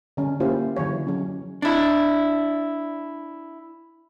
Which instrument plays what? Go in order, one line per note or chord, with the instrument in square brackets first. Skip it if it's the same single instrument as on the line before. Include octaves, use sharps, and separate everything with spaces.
[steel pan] D3 G3 C#4
A#3 C#4 E4 F4 G4 C5
D3 E3 F#3 C#5
F#3 C#4
[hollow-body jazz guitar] D4 E4